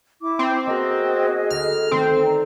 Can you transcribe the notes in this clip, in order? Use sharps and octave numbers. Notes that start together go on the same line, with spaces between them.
E4 D6
C4
A#3 B3 F#4 G#4 A#4 D#5
D2 F6
D#3 A3 C4
D5 A#5